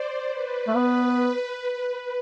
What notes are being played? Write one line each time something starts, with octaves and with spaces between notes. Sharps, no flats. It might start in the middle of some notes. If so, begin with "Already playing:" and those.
Already playing: C5 D5
B4
A3
B3 B4